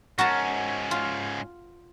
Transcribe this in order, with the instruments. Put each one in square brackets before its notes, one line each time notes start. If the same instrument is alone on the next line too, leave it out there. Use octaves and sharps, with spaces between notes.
[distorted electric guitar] G#2 C#4 [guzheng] F#4 A#4 A5
[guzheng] F4